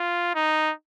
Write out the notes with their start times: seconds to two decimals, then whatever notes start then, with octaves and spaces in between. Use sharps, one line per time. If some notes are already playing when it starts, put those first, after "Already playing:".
Already playing: F4
0.35 D#4